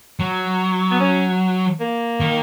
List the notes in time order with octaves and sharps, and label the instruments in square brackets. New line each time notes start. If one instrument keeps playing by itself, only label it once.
[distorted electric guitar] F#3
[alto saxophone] B3
C#4
A#3
[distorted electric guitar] D#3